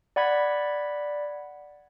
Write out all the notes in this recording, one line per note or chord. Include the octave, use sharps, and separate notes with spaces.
D5 F#5 B5 G#6 B6